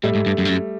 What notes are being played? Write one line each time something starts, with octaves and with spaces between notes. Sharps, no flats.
A2 G3 A3
G#2
G2
F#2
G2
F#2